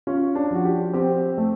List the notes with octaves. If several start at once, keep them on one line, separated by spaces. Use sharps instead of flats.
C#4 F4
D4
F3 F#4
G4
C4 G4
A3